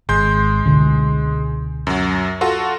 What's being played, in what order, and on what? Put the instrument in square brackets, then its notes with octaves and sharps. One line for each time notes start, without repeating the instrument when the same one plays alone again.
[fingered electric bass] G#1 [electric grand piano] G#3 C6 G6
[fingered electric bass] C#2 B2 D3
[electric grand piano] F#2 F#3
F4 F#4 A4